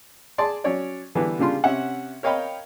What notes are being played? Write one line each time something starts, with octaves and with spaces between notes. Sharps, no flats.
G#4 D5 A5 C6
F#3 C#4 C#5 D5
D3 E3 G3 B3 D4 E4
C#3 G3 D4 F4 C6
C3 C#4 E5 F#5
A#4 C#5 D#5 F5 G5 B5